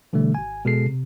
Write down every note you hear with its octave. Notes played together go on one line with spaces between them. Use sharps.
B2 D3 E3 G3 A3
G#1 G#5
B2 G#3 G#4 A4 C7
C3